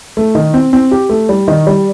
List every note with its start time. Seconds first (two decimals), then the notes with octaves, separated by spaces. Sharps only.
0.17 A3
0.35 D#3
0.54 C4
0.73 C4
0.91 G4
1.09 A3
1.29 G3
1.48 D#3
1.67 G3